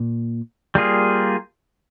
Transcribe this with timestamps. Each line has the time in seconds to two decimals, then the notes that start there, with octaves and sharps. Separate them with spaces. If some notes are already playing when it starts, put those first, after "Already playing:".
Already playing: A#2
0.75 G3 A#3 F4 G#4